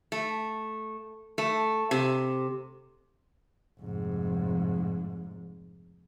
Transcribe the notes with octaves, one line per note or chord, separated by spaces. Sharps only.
A3
A3
C3
F1 G#2